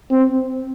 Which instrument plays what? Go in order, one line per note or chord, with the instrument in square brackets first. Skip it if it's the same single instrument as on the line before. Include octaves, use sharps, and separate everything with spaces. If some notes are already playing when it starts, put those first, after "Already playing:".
[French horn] C4